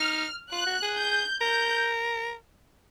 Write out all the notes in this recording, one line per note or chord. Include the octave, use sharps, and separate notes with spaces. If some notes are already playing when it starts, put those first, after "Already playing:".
Already playing: D#4 F6
F4 F#6
F#4
G#4
G6
A#4 G6